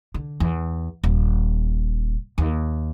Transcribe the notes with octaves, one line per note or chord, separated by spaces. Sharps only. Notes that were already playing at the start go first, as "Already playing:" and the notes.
D3
E2
D#1
D#2